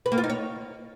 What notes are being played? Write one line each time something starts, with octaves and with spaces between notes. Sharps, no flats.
B4
A#3
F4
D#4
C#5